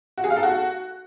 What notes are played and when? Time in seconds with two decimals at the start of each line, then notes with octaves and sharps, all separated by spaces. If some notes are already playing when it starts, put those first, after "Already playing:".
0.18 F#4
0.24 G#4
0.30 F5
0.37 A4
0.43 F#4